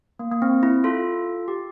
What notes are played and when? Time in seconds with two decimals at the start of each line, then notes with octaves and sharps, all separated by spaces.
0.19 A#3
0.32 A#3
0.42 C4
0.63 E4
0.84 F4 A4
1.48 G4